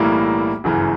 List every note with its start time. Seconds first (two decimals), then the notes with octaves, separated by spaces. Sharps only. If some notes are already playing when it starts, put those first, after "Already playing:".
Already playing: B1 A2 E3 G3 A#3
0.64 G1 F#2 C#3 E3